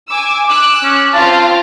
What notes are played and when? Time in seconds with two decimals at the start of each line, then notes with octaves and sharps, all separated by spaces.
0.11 G#5 D6 E6
0.48 D6 E6 F#6
0.84 C#4
1.14 C4 F4 F5 A5